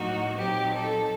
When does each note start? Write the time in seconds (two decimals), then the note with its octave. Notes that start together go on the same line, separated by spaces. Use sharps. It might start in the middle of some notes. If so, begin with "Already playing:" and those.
Already playing: A2 F#3 A#3 D#4 F#4
0.36 A#2 F#3 C4 D#4 G4
0.73 A4